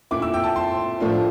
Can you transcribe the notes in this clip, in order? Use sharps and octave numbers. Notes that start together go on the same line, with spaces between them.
A#2 A3 E4 D6
E6
G5
A5
C6
A2 F3 A3 D4 F4